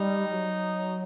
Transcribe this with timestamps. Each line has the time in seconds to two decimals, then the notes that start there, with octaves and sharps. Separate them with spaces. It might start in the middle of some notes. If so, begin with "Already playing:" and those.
Already playing: G3 D#4
0.29 F#3